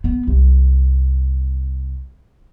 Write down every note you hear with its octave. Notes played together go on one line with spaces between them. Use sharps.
B3
C2